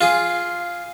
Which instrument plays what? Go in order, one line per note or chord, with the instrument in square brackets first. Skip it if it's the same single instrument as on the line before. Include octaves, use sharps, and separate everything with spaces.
[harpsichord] F4 G#4